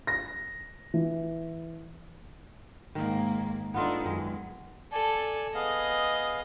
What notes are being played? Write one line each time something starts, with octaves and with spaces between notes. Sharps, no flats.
A#6
E3
G#2 D#3 A#3
B3 D4 D#4 F4 A4
F#2 D#3 G#3
A4 D5 G#5
B3 G#4 D#5 F5